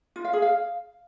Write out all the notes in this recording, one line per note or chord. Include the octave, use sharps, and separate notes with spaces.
F4
F5
G#4
F5